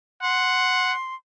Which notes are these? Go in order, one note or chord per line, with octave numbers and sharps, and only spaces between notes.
F#5 C6